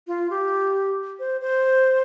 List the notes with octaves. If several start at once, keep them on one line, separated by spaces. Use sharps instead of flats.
F4
G4
C5
C5